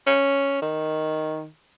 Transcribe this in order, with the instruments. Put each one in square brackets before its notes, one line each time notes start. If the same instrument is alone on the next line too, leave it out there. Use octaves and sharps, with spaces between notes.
[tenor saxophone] C#4
D#3